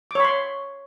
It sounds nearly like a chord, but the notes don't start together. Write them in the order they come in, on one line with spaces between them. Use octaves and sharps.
D6 C#5 B5 C6